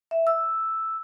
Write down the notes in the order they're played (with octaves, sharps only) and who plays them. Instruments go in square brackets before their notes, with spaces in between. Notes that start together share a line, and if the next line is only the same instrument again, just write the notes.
[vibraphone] E5
E6